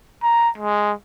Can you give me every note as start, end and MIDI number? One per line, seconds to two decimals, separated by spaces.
0.23 0.49 82
0.58 0.92 56